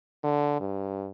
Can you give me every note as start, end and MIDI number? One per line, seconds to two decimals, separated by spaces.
0.24 0.58 50
0.60 1.09 43